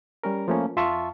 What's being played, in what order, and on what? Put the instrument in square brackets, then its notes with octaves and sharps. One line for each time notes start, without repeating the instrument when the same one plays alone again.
[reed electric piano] G3 C#4 A#4
F3 A3 A#3 C#4
F2 F4 E5 A5 C#6